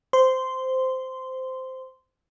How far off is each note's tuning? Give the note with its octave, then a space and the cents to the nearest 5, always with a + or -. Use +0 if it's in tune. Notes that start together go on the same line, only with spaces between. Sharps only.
C5 -10 C6 -10